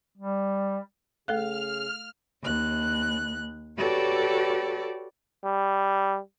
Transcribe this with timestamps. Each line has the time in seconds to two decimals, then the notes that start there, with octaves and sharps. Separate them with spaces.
0.18 G3
1.28 C#3 A3 A4 F5 F6 F#6
2.43 D#2 F#6
3.78 F#4 G4 A4 B4 C#5 D5
5.45 G3